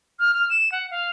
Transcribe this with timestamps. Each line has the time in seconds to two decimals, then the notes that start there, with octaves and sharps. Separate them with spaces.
0.19 F6
0.34 F6
0.50 E7
0.72 F#5
0.91 F5